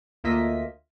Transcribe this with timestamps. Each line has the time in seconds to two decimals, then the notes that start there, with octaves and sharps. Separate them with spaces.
0.24 D2 A#3 F4 D#5 E5 B6